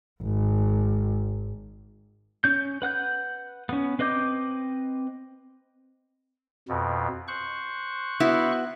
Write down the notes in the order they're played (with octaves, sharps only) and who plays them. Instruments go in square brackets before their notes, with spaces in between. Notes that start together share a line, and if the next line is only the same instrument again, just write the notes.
[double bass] G#1
[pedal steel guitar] C#4 G6
B4 F#5 F#6 G6
B3 C#4
C4 B4 D#5 D6 G6
[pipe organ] F2 B2
C5 C#6 F#6
[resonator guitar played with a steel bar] B3 E4 F#4